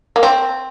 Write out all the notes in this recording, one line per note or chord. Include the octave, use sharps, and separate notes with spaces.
A#3
C4